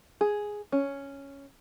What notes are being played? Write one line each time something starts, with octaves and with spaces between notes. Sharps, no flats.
G#4
C#4